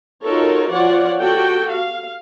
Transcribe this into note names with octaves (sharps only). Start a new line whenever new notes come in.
D#4 F4 F#4 A4 A#4 C#5
F3 F4 C#5 D5 F#5
F#4 G4 A4 G5
F5